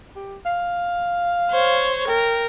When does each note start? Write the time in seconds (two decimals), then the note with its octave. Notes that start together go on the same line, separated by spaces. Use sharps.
0.16 G4
0.46 F5
1.50 C5 C#5
2.08 A#4 G5